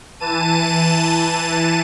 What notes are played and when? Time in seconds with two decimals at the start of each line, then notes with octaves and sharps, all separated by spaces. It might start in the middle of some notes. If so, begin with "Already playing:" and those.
0.20 E3 A5 D#7